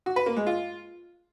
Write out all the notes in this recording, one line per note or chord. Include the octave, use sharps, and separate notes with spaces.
F#4
B4
A#3
G#3
F4